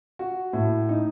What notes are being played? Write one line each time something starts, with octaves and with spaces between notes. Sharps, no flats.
F#4
A2
D#4